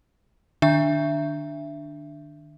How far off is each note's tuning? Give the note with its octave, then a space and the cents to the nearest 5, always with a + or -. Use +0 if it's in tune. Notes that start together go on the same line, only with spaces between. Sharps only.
D#3 -40 D4 +0 E5 +20